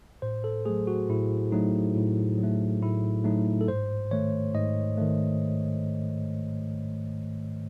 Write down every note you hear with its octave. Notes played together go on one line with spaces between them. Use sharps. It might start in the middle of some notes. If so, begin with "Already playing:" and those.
A2 C5
A4
F#3 A3 G#4
F#4
A2 E4
F#3 A3 D#4
A2
F#3
A3
A2 E4
F#3 A3 D#4
A4
G#2 C5
D#3 A3 C#5
G#2 D#5
D#3 A3